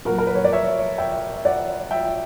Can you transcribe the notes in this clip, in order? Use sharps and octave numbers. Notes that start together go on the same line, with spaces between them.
A#2 F#3 F#4 A#4
A#4
B4
C#5
D5
C#5 E5
E5 G5
E5
D5 F#5
E5 G5